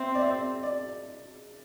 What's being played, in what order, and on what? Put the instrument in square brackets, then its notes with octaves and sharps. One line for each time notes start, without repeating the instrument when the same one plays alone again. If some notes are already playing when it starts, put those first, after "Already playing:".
Already playing: [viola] C4 [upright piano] E5
[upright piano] D5
E5
D5